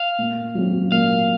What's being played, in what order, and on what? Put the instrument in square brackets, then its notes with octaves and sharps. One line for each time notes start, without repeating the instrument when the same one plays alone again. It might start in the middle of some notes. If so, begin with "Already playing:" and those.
Already playing: [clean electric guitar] F5
[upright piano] A#2
F#3 C4 F#4
[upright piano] A#2 [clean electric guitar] F5